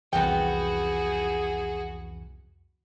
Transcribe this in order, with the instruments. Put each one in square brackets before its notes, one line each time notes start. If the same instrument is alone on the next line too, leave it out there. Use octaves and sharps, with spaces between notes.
[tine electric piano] C2 F2 E3 [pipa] B3 C4 G5 [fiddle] F#4 [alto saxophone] G#4